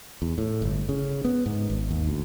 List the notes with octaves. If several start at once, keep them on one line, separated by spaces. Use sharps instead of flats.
E2
A2
G1
C#3
B3
G#2
G#1
D#2
D2